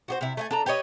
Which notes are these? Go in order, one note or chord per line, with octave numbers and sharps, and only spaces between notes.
F#4 G4 C5
C3 E4
A3 E5 G#5
D4 A4 A#5
G4 B4 C#5 D#5